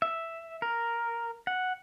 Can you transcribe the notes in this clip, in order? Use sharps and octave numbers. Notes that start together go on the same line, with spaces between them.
E5
A#4
F#5